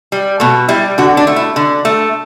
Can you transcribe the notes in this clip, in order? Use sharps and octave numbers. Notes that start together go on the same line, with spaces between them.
G3
B2 A3
G3 E4
D3 F#4
D4
A3
E4
D3
A3